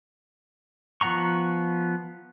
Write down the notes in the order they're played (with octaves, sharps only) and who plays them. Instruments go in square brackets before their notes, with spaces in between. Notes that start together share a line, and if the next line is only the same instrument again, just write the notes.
[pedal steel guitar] F3 B3 F#5 A#5 C#6